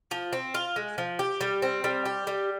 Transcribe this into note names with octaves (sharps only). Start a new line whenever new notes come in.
F3
C4
F4
G#3
F3
G4
G3
C4
G3
G4
G3